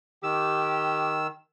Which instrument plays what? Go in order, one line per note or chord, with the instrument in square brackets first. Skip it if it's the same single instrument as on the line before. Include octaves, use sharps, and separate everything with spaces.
[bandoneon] D#3 E6 [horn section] G4